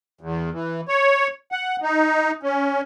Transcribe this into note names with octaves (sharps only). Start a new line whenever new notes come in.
E2
E3
C#5
F#5
D#4
C#4